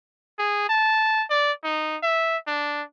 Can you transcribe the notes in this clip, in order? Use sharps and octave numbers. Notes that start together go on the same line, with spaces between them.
G#4
A5
D5
D#4
E5
D4